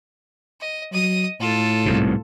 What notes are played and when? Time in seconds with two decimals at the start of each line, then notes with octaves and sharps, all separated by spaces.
0.61 D#5
0.93 F#3 D#5 D#6
1.40 A2 F4 A4
1.86 C2 G#2 B2